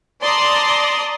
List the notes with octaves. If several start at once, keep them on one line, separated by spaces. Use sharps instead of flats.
D5 A5 A#5 C6 D#6